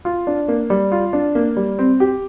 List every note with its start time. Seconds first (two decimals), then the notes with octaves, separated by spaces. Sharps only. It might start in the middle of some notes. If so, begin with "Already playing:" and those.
0.05 F4
0.27 D4
0.48 A#3
0.70 G3
0.92 F4
1.13 D4
1.35 A#3
1.57 G3
1.79 C4
2.00 G4